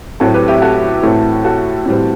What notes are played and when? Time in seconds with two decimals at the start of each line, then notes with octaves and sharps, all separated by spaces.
0.20 A2 F#3 A3 C4 F#4 A4
0.34 G4 B4
0.48 E4 G4
0.62 F#4 A4
1.03 A2 E3 A3 C4
1.44 F#4 A4
1.86 A2 E3 G3 C4